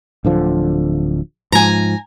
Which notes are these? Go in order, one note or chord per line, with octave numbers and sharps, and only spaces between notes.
D1 D3 F3
G#2 F3 G#5 A#5